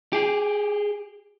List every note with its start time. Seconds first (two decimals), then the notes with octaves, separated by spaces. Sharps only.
0.13 G4 G#4